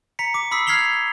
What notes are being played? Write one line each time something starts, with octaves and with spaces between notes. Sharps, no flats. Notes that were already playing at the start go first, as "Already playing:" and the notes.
A#5 B6 C#7
D6
B5 D#6 E6 B6 C7
F6 G#6 B6 C7 F7 G7